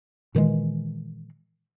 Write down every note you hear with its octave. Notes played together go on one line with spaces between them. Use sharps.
A#2 D#3 E3 G#3